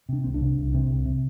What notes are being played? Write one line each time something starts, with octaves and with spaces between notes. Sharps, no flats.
C3 D4
C2 C4
D4
C3
C2
C3 C4
C2
C3